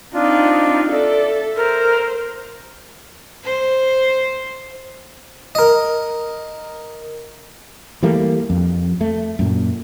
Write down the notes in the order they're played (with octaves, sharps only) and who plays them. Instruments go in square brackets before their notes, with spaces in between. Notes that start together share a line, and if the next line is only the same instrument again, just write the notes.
[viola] C4 D#4 [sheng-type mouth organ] D4 F4
[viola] A4 [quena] D5 [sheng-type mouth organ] E5
[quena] A#4 [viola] C5
[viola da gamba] C5
[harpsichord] A#4 D#5
[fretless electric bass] E3 G3 A3 A#3
F2
A3
F#2 A#2